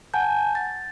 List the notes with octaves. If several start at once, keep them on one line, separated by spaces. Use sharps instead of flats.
F#5 G#5 A5 G6
A6